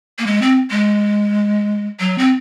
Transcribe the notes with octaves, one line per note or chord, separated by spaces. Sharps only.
A#3
G#3
C4
G#3
F#3
C4